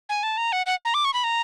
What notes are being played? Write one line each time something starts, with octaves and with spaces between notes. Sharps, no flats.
G#5
A5
A#5
F#5
F#5
A#5
D6
C#6
B5
A#5